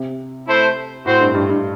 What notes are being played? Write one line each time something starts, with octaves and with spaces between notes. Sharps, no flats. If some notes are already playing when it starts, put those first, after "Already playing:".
Already playing: C3
A3 E4 A4 C5
A2 C4 F#4 C5
G2
G2
G2